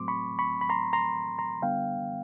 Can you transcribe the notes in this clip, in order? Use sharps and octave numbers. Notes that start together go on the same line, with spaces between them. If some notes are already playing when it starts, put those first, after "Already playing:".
Already playing: A2 F#3 A3 C4 C6 D6
B5 C#6
B5 C#6
B5
A#5 C6
A#5 C6
A#5 C6
D3 G3 B3 D4 F5 G5